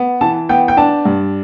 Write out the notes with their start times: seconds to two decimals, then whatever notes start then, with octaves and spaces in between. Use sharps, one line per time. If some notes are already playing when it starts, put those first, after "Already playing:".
Already playing: B3
0.21 E3 A5
0.49 B3 G5
0.68 G5
0.77 D4 A5
1.05 G2